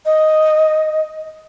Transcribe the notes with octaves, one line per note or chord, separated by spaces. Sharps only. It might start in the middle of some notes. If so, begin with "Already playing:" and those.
D#5